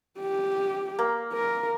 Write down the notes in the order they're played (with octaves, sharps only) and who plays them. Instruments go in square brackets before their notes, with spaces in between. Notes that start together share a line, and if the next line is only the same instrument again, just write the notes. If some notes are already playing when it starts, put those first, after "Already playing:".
[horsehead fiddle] G4
[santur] A#3
[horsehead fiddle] A#4